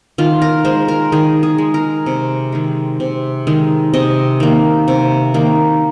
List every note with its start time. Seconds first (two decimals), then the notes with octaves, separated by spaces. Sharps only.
0.18 D#3 F4
0.42 A#4
0.65 G#3 C5
0.88 A#4
1.12 D#3 G#4
1.43 G#4
1.58 G#3
1.74 A#4
2.06 C3
2.52 D#3 G#3
3.00 C3
3.47 D#3 G#3
3.94 C3 D#5
4.40 D#3 A#3
4.88 C3
5.34 D#3 A#3